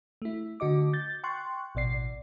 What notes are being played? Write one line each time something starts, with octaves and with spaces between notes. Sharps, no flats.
A3 E4
D3 F#4 D#5 D6
G6 A6
G5 C6 C#6 F#6
A1 B2 D5 C7